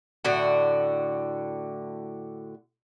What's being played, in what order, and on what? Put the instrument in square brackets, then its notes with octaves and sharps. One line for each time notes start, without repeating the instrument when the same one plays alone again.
[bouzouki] A2 D3 F#4